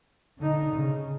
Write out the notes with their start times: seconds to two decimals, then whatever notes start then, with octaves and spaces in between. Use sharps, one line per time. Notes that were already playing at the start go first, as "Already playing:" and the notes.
0.38 D3 D#4
0.74 C#3